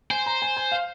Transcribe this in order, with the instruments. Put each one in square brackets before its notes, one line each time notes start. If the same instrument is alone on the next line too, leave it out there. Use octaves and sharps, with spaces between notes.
[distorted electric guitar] C5 [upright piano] G#5
[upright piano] A#5
G#5
G#5
F5